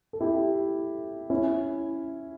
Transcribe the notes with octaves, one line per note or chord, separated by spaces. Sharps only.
A4
E4 G4
C#4 E4